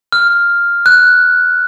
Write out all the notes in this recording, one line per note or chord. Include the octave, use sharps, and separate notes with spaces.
F6
F#6